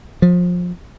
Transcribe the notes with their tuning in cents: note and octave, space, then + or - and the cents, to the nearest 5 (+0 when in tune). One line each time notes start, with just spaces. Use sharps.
F3 +25